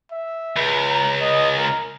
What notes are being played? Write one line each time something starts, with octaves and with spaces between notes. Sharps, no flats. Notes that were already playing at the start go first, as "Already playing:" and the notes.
E5
C#2
A#5
D#5
A#4